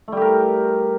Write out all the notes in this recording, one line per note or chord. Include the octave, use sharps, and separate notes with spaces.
G3 A3 G4 A#4